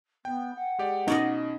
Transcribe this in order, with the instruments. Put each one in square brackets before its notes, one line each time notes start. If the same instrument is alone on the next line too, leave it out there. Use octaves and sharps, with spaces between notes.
[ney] B3 [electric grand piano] G5
[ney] F#5
[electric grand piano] G#3 G4 D5
[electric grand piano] B2 [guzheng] C#4 D5 D#5 [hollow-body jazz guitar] D#4